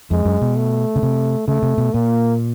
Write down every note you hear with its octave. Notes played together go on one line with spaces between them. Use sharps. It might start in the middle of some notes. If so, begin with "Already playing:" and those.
F2 G#3
F#2
B2
A3
C#3
C3
C#3 A3
C3
B2
A#2 A#3